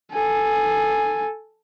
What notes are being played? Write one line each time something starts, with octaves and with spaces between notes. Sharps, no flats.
A4 G#5